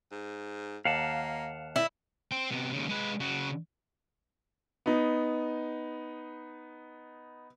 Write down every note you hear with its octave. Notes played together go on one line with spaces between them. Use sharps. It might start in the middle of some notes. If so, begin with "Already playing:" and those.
G#2
D#2 A#3 F5 F#5 A5
A3 E4
C5 G5
C3 B3
D#2 C#3
G#3 B4
C#3 F#4
B3 D#4